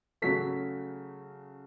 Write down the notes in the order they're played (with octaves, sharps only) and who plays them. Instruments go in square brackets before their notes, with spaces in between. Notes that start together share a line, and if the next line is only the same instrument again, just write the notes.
[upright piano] C#3 F#3 A3 B6